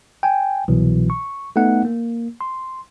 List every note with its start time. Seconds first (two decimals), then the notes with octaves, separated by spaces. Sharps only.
0.23 G5 G#5
0.68 C2 B2 E3 F#3
1.10 C#6
1.56 A3 B3 D#4 A4 F#5
1.85 A#3
2.41 C6